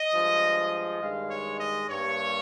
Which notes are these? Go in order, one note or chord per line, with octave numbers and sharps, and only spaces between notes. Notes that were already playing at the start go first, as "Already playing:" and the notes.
Already playing: D#5
G2 F3 G#3
G2 D#3 G#3 F5
C#5
D#5
G2 G3 A#3 C#5